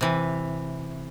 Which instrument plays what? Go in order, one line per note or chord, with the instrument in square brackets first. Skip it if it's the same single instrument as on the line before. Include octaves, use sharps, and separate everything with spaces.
[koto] C3 E3